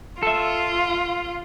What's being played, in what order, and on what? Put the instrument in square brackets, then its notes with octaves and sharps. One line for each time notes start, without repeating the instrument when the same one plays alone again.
[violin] F4 [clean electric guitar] A4 E5